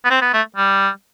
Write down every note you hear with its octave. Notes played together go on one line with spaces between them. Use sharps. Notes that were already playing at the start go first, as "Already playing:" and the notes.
B3
C4
B3
A3
G3